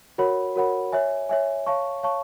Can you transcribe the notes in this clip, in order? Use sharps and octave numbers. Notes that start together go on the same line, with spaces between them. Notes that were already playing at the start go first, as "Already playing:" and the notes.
F#4 A#4 C#5 F#5 B5
F#4 A#4 C#5 F#5 B5
C#5 E5 G#5
C#5 E5 G#5
C#5 F5 A5 C#6
C#5 F5 A5 C#6